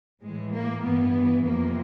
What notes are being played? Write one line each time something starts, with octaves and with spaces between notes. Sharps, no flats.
A2 E3 G#3
A#3
G2 E3 B3
F2 C3 E3 A#3